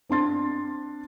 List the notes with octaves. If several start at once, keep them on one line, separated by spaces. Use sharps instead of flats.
C4 D4 C6 A6